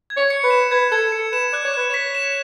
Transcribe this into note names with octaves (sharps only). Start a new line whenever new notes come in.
G#6
C#5
C#7
B4
E7
B4 G#6
A4 G#6
A4 C#7
B4 E7
D5 F#6
C#5
B4 F#6
C#5 B6
E7